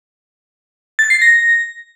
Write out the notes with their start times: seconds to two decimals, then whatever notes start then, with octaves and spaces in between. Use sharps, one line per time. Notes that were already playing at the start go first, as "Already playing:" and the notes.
0.99 A6
1.10 C7
1.22 A#6